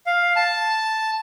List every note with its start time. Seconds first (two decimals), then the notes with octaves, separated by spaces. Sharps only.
0.06 F5
0.36 A5